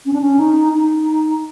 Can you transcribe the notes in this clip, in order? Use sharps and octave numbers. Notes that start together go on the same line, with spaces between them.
C#4
D4
C#4
D#4
D#4